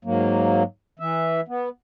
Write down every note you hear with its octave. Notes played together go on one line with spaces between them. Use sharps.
G#2 F#3 A#3
E3 E5
B3